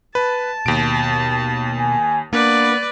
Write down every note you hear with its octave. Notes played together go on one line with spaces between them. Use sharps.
B4 A5
D#2 B2 D7
G#5
A#3 B3 D4 B4 D5